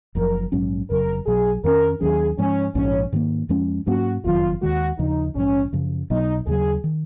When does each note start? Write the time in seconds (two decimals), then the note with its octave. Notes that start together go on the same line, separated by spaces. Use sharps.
0.15 F#1 F#2 C#3 F3 A#4
0.52 A#1 G#2 F#3 C#4
0.90 F1 F2 C#3 F#3 A#4
1.26 B1 B2 F#3 G#4
1.64 F2 D#3 A#3 C#4 A#4
2.01 D#2 D#3 F#3 C#4 G#4
2.38 G#2 F3 G#3 C#4
2.75 A#1 G#2 F3 C#4
3.12 G#2 D#3 A#3
3.49 F2 F3 G#3 C#4
3.86 G#2 F#3 A#3 C#4 F#4
4.23 F#1 F2 D#3 F#3 F4
4.62 D#2 D#3 G#3 F#4
4.98 D#2 C#3 F3 D#4
5.35 A#1 G#2 F3 C#4
5.73 F#2 C#3 F3
6.10 B1 B2 F#3 B3 D#4
6.47 D#2 C#3 F#3 G#4
6.84 D#3